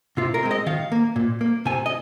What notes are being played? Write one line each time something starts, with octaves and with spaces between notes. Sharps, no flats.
C3 F4
A#4
G#3 C4
D#5
D#3 F5
A#3
A#2
A#3
C3 G#5
D#5